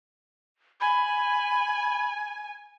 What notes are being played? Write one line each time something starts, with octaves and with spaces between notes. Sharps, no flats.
G#5 B5